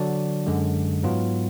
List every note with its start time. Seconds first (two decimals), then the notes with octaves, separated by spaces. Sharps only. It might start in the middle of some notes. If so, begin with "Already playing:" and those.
Already playing: D3 F#3 D4 F#4 D5
0.47 F#2 D3 G#3
1.04 G#2 F#3 B3 F4